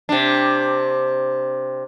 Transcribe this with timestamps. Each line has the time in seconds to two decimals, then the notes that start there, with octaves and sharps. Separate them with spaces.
0.09 C3 D4